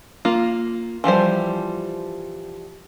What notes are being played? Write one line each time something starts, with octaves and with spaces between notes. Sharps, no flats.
A#3 F4
E3 F3 G3 C5